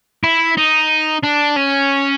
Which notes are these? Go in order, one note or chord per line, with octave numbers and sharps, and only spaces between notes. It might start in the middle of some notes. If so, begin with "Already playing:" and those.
E4
D#4
D4
C#4